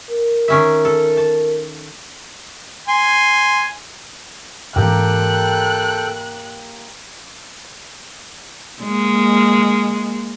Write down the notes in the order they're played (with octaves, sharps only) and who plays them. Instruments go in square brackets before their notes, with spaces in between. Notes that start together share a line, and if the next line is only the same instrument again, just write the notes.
[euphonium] A#4
[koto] D#3 C#4 E5
A4
A5
[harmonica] G#5 C6
[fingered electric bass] G#2 E3 [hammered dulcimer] A#3 G4 A#5 [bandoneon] A4 G5 [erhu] F#6
[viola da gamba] G#3 A#3